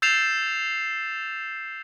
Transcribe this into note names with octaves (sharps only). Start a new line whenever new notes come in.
E6 G6 A6 C7 E7 F7